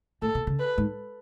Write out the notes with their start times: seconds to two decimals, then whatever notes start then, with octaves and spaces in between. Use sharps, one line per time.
0.22 A2 A4
0.35 B2
0.47 C#3
0.59 B4
0.78 G#2